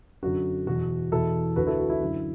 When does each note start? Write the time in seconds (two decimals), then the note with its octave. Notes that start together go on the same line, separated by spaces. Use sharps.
0.23 F#2 D3 F#4
0.66 E2 B2 F#4
1.12 E2 B2 E4 A4
1.56 D2 D3 F#4 B4
1.67 E4 A4
1.78 F#4
1.89 E4
2.00 F#2 D3